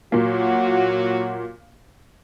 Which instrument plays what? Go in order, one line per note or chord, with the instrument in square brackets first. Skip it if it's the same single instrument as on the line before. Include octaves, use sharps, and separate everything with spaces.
[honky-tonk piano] A#2 A#3 [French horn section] F#3 F#4